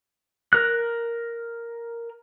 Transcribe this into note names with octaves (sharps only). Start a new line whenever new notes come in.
A#4 F#6